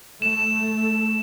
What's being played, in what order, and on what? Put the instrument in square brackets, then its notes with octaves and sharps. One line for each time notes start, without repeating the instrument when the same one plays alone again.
[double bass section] A3 [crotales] E7